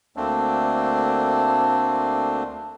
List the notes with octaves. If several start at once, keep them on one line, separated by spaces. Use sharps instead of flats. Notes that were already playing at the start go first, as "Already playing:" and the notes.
D2 A3 A#3 C4 D4